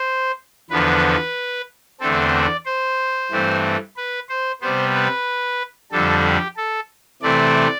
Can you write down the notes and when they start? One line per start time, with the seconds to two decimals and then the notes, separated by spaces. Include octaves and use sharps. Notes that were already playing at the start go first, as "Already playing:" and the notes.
Already playing: C5
0.70 E2 D3 F3 B3 B4
2.00 E2 D3 A3 C4 A4
2.34 D5
2.66 C5
3.31 G2 E3 A3 C4
3.97 B4
4.29 C5
4.61 C3 G3 B3 C5
4.94 B4
5.92 F2 D3 G3 A4
6.25 G4
6.57 A4
7.22 C3 E3 A3 C4 D5